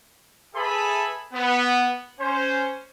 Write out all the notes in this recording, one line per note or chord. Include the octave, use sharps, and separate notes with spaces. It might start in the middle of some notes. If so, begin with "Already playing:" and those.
G#4 A4 B4 E5 A5 B5
B3
C#4 C5